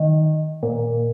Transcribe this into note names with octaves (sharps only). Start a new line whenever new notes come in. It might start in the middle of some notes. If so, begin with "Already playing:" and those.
Already playing: D#3
A#2